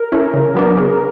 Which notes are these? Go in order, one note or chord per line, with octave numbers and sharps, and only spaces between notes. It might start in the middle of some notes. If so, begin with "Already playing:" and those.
Already playing: A#4
A3 C#4 E4
C#3
F#3 B3 D4
C#3